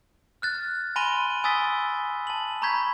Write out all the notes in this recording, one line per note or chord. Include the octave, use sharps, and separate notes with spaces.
F6 F#6 A6
G#5 B5 C6 A#6 D#7 G7
G#5 D#6 E6 A6 B6 G7
A5 F#7
A#5 B5 C#6 G6 G#6 B6